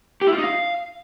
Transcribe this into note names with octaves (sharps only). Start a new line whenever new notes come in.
G4
E4
F4
D#4
F5